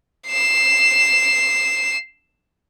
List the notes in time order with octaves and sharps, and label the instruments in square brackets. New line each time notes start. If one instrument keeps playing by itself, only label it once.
[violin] C7 E7